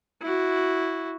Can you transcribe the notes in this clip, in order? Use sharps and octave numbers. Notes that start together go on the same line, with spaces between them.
E4 F#4